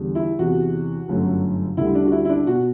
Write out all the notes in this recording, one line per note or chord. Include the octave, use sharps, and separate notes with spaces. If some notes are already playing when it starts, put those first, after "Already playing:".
Already playing: E2 D3 G3
E4
E2 C3 E3 F#4
G1 F#2 F#3 A3
D2 D3 G3 E4
D4
F#4
E4
E4
D4
B2 F#4